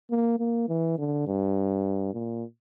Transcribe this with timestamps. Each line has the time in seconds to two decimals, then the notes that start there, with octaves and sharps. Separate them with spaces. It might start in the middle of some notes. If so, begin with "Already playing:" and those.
0.10 A#3
0.39 A#3
0.68 E3
0.98 D3
1.27 G2
2.13 A#2